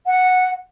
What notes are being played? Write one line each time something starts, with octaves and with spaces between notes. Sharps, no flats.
F#5